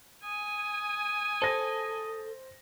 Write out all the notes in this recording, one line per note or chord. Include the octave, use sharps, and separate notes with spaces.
G#5 D#6
A4 C5 A#6